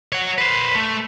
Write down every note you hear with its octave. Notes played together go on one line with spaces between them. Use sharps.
C#5 F#5
B4 C5
A3